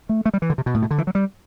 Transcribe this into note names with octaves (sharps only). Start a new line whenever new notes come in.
A3
A3
G3
E3
D3
C3
B2
A2
B2
D3
E3
F#3
G3